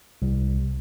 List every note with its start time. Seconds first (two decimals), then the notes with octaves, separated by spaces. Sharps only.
0.22 C2